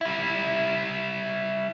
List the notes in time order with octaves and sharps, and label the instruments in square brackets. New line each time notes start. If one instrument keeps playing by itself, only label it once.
[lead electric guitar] G3 E4